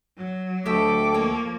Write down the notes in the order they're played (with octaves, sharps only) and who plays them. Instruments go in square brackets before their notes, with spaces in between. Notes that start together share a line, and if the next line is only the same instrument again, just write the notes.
[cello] F#3
[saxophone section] D2 A3 [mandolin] G4 D#5 E5 [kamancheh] A4 D6
[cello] F3 A#3 [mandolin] C#5